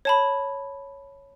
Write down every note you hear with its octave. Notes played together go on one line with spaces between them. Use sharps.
C#5 A5 B5